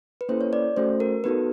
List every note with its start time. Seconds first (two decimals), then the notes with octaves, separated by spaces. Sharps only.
0.21 B4
0.29 A#3 C#4 E4 A4 C5
0.41 C#5
0.53 D5
0.77 A3 C#4 F#4 A4 C5
1.00 A#4
1.24 B3 D#4 F#4 A4 B4